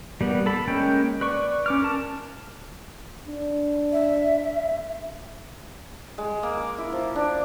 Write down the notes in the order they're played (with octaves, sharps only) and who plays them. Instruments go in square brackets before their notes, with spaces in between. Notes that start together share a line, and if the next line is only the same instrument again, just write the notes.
[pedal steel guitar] G3 A#3 B3
A4 B5
G#3 A#3 C#4 G5
B4 D5 C#6
C#4 D6 F6
A#4 A5
[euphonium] D4
[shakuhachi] E5
[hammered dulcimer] G#3
A#3
D6
E4
F3
D4